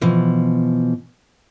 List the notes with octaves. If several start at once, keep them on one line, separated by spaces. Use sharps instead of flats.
B2 E3 F3